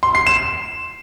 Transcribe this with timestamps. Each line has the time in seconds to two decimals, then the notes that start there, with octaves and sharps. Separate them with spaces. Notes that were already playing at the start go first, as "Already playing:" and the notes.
0.03 C6
0.15 C7
0.27 E7